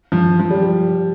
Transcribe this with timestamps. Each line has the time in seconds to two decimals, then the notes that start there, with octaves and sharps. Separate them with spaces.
0.12 F3
0.40 F3
0.50 G3